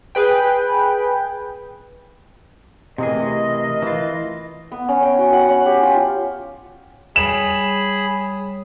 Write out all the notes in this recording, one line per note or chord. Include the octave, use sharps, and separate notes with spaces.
G#4 B4 G5
C3 E3 A3 G#4 A#4 D#5
E3 F4
B3
C#4
G5
F#4
F#5
C#4
G4
F4
G3 G#4 C#5 B5 E7